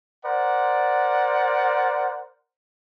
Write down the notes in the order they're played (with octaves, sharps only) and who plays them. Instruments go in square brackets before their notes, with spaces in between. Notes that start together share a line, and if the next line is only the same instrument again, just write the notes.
[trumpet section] A#4 C5 D5 F#5